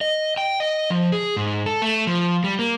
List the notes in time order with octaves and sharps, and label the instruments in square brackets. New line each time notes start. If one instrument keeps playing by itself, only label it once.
[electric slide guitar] D#5
G5
D#5
F3
G#4
G#2
A4
A3
F3
G3
A#3